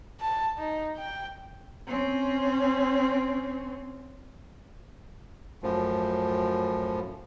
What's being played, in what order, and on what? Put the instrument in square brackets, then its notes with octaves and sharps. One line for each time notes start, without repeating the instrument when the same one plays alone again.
[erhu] A5
D#4
G5
[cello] C4 C#4
[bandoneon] F#2 A2 F3